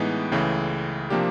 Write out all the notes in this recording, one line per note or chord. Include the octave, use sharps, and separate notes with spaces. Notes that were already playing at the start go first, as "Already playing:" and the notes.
Already playing: A2 E3 G#3 B3 D#4
C#2 C#3 E3 A3
C3 F3 A#3 D4 G4